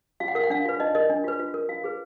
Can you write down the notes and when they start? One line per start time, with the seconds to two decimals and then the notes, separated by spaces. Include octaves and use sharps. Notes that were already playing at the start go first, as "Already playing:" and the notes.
0.20 F4 F5
0.28 F#5
0.35 A#4 F5
0.44 F#5
0.50 D4 F5
0.66 F4 B4
0.80 D#4 D#5
0.95 A#4 D#5
1.10 D4
1.24 F4 B4
1.39 F4
1.54 A#4
1.69 F4 F5
1.84 G#4 B4